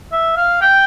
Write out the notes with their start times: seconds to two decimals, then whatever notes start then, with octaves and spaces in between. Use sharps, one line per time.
0.12 E5
0.36 F5
0.61 G5